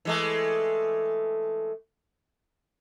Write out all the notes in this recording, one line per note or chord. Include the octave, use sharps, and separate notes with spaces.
E3 G#3 A3